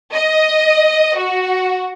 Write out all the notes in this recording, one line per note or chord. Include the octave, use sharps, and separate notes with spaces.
D#5
F#4